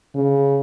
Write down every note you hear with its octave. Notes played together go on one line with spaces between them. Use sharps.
C#3